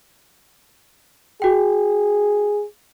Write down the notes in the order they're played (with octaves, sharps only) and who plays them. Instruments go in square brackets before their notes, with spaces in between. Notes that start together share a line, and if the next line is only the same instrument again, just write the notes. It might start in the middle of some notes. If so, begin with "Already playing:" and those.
[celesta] F#4 G5 [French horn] G#4